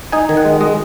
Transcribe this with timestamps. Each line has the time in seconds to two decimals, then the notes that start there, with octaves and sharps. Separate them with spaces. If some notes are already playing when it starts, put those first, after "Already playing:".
0.12 D#4 G#5
0.29 D#3
0.37 F#5
0.45 G#3
0.61 G#3 D#5